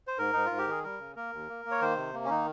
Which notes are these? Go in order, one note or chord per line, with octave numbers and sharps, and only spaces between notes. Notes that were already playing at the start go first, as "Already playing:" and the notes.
C5
G#2 A#4
G#2 D#4
F4
G#2
G4
D#3 G#4
G3 A#4
C#3
A#3 A#4
D#2
A#3
A#3
C#5
D#3 C5
C3
A#3
C#4
D#3 D#4